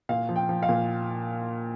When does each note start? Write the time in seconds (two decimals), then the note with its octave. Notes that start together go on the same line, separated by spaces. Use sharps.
0.09 A#2 F5
0.29 F3
0.36 G5
0.49 F3
0.63 F5
0.69 A#2